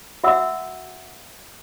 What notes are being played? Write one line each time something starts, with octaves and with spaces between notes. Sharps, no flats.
F#4 E5 F#5 E6